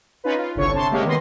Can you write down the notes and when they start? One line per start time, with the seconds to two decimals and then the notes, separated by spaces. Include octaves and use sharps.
0.24 C#4 D#4 F4 B4
0.38 F4
0.55 G1 C2 D3 C#5 C#6
0.73 C3 A5 C6
0.91 C3 G#3 A#3 C#4 G4
1.05 D#3 B3 B4 D#5 C6 A#6